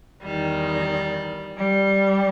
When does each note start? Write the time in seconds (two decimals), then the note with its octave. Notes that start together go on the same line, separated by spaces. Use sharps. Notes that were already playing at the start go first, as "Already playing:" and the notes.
0.24 E2 D#3 G3
1.56 G3